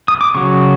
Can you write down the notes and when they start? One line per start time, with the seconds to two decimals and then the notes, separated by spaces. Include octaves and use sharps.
0.08 D#6
0.21 D6
0.35 C#3 F#3 C#6